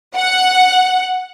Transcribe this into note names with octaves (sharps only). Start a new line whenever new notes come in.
F#5